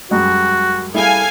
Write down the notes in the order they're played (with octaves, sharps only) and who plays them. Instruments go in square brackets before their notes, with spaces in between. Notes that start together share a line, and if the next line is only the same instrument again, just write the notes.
[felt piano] F#2 G3 G#3 [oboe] F#4
[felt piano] G3 E4 G#4 [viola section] A4 F5 G#5